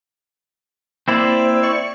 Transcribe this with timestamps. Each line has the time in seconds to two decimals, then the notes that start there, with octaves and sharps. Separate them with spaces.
1.08 A#3 C4 E4 C5 D5
1.63 D5 C#6 C#7